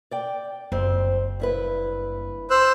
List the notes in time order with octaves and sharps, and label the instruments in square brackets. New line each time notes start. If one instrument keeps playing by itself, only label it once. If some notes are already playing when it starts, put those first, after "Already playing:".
[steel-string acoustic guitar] D5 G5
[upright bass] F#1 [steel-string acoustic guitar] F2 C4
[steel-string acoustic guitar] G2 E4 B4
[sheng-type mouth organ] C5 E6 F#6